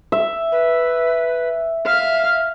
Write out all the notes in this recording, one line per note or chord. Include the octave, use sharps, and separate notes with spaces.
E5
B4
E5 F5